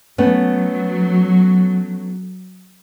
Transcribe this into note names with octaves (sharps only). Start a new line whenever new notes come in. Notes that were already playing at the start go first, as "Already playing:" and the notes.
F#3 A3 B3 C#4